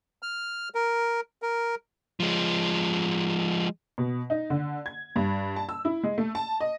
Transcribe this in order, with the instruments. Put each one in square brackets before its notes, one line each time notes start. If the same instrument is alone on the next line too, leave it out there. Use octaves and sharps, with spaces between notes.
[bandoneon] F6
A#4
A#4
[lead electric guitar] F3 G#3
[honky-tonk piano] B2
D#4
D3
G#6
G2
A5
E6
E4
G#3
A3
A5
D#5